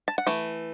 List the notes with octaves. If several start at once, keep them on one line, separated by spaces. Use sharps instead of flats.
A5
F#5
E3 A3